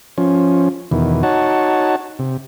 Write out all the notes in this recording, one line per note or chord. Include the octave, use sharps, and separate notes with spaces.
F3 C#4
E2 B2 D#3 E3
D#4 F#4 C#5 F#5 A5
C3